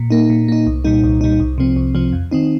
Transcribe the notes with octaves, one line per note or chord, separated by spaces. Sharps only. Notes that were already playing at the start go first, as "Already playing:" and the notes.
Already playing: A#2
A#3 D#4
A#2
A#3 D#4
C2
A#2 G3 D#4
C2
A#2 G3 D#4
C2
C3 F3 C4
C2
C3 F3 C4
F2
D#3 C4 D#4